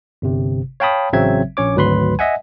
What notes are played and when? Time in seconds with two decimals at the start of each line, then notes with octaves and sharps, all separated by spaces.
0.22 G1 C3
0.80 C#5 F5 G5 A5 B5 D#6
1.13 A1 C#3 F#3 C4 E5 G#6
1.57 A#1 C#4 C#5 D6
1.76 G#1 D2 F#3 B4 B5 C6
2.19 D#5 E5 F#5 G#5